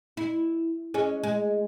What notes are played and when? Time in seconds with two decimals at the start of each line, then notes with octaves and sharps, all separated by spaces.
0.17 E4
0.94 G#3 C#4
1.23 G#3